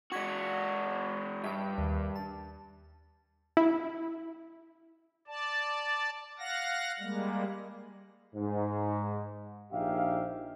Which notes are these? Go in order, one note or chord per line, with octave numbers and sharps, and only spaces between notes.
G#3 F#4 C#6 G#6 B6
G2 E5 G5
D#2
A5
E4
D5 A5
F5 F#5 A#6
G3 G#3 A#3
G#2
A#1 D#4 G4 G#4 E5 F5